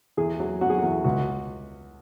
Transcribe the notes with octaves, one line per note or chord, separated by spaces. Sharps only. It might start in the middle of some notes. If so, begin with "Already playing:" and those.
E2 G#4
F#3
F#3 F#4
G#4
F#4
E2
C#2 F#4